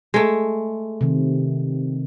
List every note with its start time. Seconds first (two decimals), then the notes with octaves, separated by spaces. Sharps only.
0.14 G#3 A3
1.01 C3 D#3